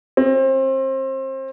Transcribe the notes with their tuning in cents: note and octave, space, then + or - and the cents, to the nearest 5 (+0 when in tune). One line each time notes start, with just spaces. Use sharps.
C4 +30